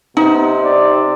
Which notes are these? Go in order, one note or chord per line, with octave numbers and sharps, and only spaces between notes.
C3 B3 D#4
D5